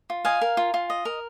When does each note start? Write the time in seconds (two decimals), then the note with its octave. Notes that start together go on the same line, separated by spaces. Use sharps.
0.10 F4
0.25 D#5 F5 G#5
0.41 A#4
0.57 F4
0.74 F4
0.90 D#5
1.05 A#4